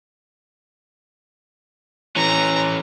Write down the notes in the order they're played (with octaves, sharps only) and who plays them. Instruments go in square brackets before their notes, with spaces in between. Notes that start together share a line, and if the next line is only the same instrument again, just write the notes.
[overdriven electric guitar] E3 C#4 [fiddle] A#5